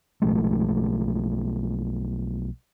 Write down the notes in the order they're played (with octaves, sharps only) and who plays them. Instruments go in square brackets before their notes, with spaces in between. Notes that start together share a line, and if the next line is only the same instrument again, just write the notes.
[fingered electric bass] B1 F3 G#3 A3